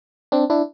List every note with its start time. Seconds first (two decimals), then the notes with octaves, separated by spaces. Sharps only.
0.32 C4 D4
0.50 D4 E4